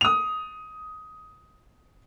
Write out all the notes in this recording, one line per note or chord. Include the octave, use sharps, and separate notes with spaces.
D#6 F7